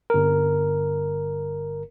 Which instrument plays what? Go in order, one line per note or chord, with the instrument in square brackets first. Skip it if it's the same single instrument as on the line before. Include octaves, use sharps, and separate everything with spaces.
[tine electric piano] G1 A#4